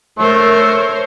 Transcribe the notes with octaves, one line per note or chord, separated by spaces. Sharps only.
A3 A#4 C5 C#5